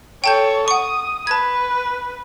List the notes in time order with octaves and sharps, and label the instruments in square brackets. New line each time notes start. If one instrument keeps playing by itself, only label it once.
[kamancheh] A4 C#5 [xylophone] G5 A5 G6
[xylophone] F#5 C#6 [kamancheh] D#6
[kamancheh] B4 [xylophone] A5 G#6